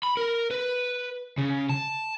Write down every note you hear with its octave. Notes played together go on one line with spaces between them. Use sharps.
B5
A#4
B4
C#3
A5